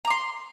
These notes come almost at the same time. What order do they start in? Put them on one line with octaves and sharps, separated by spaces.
A#5 D6 C6